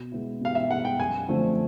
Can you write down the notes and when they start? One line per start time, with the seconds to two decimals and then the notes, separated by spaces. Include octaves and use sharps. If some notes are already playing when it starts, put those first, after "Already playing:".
Already playing: B2
0.12 G#3 B3 E4
0.41 B2 F5
0.55 E5
0.70 G#3 B3 E4 F#5
0.85 G5
0.99 F#2 G#5
1.28 D3 F3 A3 C4